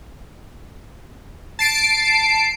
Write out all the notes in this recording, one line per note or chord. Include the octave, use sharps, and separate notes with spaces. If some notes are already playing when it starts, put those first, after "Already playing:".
A5 C7 D7